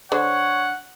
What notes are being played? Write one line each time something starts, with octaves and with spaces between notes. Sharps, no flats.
D3 C5 C#5 F#5